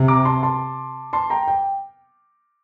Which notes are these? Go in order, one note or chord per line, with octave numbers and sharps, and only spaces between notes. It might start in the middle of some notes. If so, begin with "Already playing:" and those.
Already playing: C3
A#5 D6
A5 C6
A5 C6
A5 C6
G5 A#5
G5